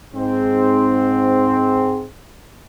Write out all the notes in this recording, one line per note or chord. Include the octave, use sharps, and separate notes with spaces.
G#2 C4